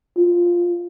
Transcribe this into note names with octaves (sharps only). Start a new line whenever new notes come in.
F4